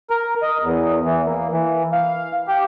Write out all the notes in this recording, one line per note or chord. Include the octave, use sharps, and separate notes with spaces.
A#4
D#5
E2
E3
A#3
E3
F5
G4